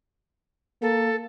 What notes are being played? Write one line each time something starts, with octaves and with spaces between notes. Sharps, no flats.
A#3 A4